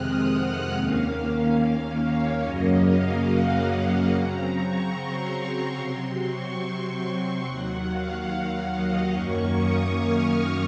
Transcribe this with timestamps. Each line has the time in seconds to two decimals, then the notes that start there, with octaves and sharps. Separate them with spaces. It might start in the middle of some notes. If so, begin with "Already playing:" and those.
Already playing: F2 C3 D#3 G#3 C4 D#6 F6 F#6
0.31 F#5
0.73 D#2 D#3 A#3 C#4 F5
1.99 C#5
2.41 F#2 C#3 F#3 A#3 C#4 D#5
2.83 F5
3.25 F#5
4.08 C#3 F#3 C4 A#5
4.51 C#6
4.93 C6
5.35 A#5
5.76 C3 F#3 C4 C6
6.19 C#6
6.61 C6
7.44 D#2 D#3 F#3 F#5
7.87 F5
8.70 D#5
9.12 F#2 D#3 A#3 C#4 C#6
9.54 D#6
9.97 F6